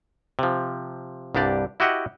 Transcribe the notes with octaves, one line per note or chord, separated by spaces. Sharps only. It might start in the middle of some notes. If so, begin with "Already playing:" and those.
C3 F3
C2 G2 D4 G4 D5
E4 F#4 G4 D#5 E5 F#5